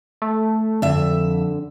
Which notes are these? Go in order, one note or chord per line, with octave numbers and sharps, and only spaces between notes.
A3
F2 D3 E5